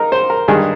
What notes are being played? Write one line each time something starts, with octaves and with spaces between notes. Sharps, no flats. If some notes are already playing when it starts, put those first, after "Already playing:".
Already playing: D#4 A#4
C5
A#4
G2 D#3 G#3 G#4